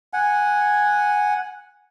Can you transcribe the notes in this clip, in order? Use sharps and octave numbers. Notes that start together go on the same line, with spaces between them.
F#5 G#5